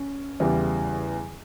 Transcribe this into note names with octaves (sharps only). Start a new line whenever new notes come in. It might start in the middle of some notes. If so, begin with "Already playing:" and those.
Already playing: C#4
E2 C#3 E3 G3